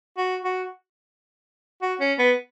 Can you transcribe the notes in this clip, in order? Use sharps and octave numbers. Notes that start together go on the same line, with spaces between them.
F#4
F#4
F#4
C#4
B3